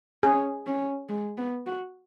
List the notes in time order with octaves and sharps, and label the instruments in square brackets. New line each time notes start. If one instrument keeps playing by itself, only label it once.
[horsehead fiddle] C#4 [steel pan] G#4
[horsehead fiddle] C#4
G#3
B3
F#4